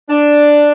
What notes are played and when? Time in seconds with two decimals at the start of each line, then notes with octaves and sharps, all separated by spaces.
0.09 D4